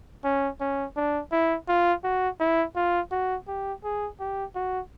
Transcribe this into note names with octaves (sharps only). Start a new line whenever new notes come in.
C#4
C#4
D4
E4
F4
F#4
E4
F4
F#4
G4
G#4
G4
F#4